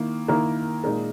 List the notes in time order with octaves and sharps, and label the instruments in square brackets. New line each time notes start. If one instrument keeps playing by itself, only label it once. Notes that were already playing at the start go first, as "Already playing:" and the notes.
Already playing: [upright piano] D#3 A#3 E4
D#3 A#3 E4 A#4
A#2 G#3 D#4 A#4